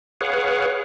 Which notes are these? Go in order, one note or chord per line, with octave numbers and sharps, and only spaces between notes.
G#4 B4 C#5 F5 F#5